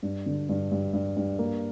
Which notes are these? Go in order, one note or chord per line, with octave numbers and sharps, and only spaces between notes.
G2
D3
G2
G2
G2
G2
A#3